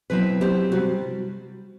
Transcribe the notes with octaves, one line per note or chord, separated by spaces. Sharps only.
B2 F#3 C4 E4 B4
B2 F#3 C4 E4 G4
C3 G3 F#4